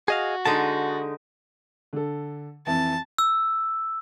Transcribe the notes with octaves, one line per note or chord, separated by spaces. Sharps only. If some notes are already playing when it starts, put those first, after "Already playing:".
F#4 G#4 D#5 F5
D3 G#3 D#4 A5
D3 A4
F2 E3 A5
E6